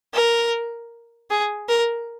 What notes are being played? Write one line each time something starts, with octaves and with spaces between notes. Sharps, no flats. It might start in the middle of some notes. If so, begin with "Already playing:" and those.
A#4
G#4
A#4